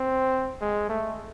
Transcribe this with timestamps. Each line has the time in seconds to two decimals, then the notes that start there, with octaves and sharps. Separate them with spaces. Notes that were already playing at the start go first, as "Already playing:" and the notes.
Already playing: C4
0.61 G#3
0.89 A3